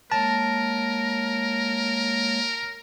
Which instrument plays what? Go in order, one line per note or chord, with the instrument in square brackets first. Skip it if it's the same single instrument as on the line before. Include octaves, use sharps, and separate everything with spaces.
[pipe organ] G#3 A#3 C#5 [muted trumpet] A#4 [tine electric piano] A5